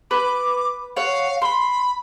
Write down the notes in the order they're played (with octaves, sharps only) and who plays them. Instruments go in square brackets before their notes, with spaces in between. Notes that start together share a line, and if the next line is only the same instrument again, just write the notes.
[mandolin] B4 [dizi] D6
[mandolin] C#5 F#5 [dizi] F5
[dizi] B5 [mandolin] C6